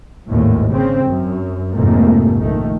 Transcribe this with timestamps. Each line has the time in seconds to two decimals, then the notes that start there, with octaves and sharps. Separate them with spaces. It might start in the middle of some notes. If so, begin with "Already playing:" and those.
0.29 G#1 D#2 A2
0.73 C#3 C4
1.07 F#2
1.73 F1 G#2 A3 A#3
2.40 A#1 D#3 A3